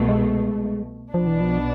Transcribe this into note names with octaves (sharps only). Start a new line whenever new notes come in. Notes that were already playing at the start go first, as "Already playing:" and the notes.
Already playing: C2 B2 A3
G#3
B1 B2 F3 B3 D4
E3
F3